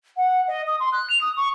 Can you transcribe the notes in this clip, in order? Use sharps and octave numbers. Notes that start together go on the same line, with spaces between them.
F#5
D#5
D#6
C6
F#6
F7
D#6
C#6